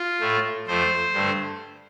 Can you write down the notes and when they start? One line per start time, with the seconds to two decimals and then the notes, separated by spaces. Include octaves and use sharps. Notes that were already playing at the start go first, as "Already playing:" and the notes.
Already playing: F4
0.21 A2 A3
0.67 F2 F3 A3 C5
1.13 G2 D3 A3